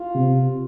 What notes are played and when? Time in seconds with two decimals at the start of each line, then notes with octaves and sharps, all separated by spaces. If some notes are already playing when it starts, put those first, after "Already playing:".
Already playing: F4
0.15 C3